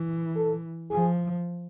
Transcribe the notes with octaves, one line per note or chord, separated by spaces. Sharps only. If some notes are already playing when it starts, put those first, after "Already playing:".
Already playing: E3
A4
F3 G#4